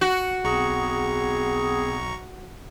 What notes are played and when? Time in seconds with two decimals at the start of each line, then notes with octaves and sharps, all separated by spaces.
0.01 F#4
0.45 B1 B3 C4 G#4 A#5 C#6